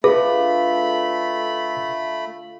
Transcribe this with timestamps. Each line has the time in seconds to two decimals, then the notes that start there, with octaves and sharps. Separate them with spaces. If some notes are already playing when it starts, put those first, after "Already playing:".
0.04 D3 A3 F4 G#4 B4 B5